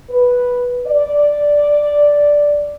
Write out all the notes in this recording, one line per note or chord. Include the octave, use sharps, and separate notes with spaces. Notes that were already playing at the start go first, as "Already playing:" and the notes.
B4
D5